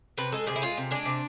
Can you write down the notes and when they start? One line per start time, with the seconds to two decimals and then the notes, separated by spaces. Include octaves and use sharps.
0.18 C3 B4
0.32 G#3 A4
0.47 C3 G#4
0.56 E4
0.62 G#3 F4
0.78 C3
0.91 G#3 D4
1.06 C3